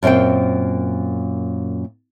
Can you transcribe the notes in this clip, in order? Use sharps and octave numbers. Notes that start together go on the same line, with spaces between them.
F#2 A#2 C4 C5 G5